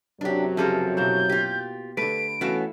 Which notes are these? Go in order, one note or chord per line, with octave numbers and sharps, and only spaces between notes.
F#2 C3 F#3 D4 G4
C#3 F3 C#4 G4 A4 A#4
B2 A#3 E4 G6
F4 G4
D3 A3 B4 D7
E3 A3 B3 C#4 E4 F#4 F5